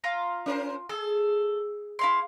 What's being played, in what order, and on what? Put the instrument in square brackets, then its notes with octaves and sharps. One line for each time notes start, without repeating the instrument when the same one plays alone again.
[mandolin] F4 F5 A#5
[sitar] C#4 A#4 C5
[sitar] G#4 [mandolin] A4
[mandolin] E4 F5 C6